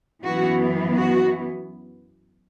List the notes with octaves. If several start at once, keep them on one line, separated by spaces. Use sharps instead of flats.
F#2 E3 B3 F#4
F#4